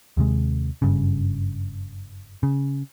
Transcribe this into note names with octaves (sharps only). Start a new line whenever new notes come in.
D#2 C3 G#3
F#1 G2 C#3
C#3